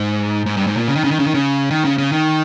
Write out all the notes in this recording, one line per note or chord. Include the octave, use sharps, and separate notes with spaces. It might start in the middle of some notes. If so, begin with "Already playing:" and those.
Already playing: G#2
G#2
G2
G#2
A#2
C#3
D#3
C#3
D#3
C#3
D#3
C#3
D#3
C#3
C#3
D#3